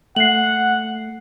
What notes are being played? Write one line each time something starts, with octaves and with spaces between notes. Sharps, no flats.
A3 F#5 C7 F#7